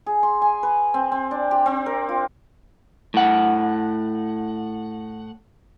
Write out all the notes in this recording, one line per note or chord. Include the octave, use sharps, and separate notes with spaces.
G#4
C6
G#5
B4
C4
C4
D4
G4
C4
A#4
F4
A2 F#5